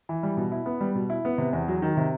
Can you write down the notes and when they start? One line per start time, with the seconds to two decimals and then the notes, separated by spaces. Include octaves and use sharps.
0.09 E3
0.23 G3
0.37 B2
0.52 E4
0.66 B3
0.81 G3
0.95 B2
1.10 E4
1.25 B3
1.38 C3
1.53 E2
1.68 F#3
1.82 D#3
1.97 C3